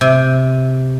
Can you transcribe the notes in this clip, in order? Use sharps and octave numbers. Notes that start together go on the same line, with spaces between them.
C3